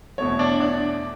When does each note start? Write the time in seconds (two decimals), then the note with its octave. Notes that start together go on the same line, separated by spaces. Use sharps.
0.18 E2 B2 A3 C#5
0.39 D4 D5
0.60 D4 D5